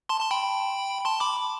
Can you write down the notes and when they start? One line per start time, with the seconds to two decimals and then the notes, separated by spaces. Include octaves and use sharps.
0.09 A5 C6
0.20 A5 C6
0.31 G5 B5
1.05 A5 C6
1.20 B5 D6